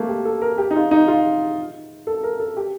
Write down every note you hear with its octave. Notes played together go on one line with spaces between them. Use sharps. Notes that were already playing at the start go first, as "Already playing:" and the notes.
Already playing: A3 A#3
G4
A4
A#4
G4
D#4
F4
D#4
F4
A4
A#4
A4
G4